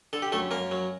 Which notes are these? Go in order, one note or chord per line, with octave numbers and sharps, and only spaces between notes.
D3 A4
G4
F#2 A3 A4
F#2 A#3 A#4
F#3